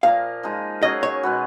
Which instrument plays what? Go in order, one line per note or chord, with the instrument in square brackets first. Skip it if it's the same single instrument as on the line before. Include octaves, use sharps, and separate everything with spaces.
[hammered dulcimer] A#2 F3 A#3 [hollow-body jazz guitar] F5
[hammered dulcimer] F3 G#3 D#4
[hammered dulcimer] F#3 A#3 C#4 G#4 [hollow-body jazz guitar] D#5
[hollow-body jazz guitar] C#5
[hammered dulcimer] B2 G#3 B3 F#4